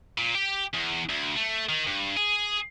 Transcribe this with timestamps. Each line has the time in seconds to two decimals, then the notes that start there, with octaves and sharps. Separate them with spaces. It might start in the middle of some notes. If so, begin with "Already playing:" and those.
0.18 A#2
0.35 G4
0.74 E2
1.10 D2
1.36 A3
1.69 D#3
1.87 G2
2.17 G#4